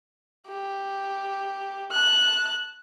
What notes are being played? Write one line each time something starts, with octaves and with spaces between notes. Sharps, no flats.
G4
A5 F#6